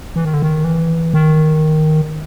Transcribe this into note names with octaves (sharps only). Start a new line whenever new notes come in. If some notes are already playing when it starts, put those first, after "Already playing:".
E3
D#3
D3
D#3
E3
D#3